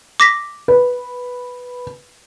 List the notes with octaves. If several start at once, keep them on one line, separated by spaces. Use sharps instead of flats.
D6 A#6 B6
B4